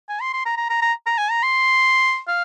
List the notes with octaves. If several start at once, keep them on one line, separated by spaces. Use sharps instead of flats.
G#5
C6
C6
A#5
A#5
A#5
A#5
A#5
G#5
A#5
C6
F5